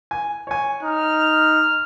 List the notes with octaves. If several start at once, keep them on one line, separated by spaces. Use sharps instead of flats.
G#5
C#5 G#5
D#4 F6